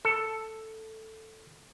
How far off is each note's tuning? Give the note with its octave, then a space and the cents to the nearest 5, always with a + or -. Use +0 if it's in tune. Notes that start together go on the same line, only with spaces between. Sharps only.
A4 +5